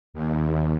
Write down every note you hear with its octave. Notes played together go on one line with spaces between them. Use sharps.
D#2